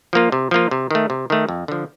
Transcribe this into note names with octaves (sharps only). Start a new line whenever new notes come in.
F3 A#3 F4
C3
F3 A#3 F4
C3
D#3 A3
C3
D#3 A3
F2
D3 F3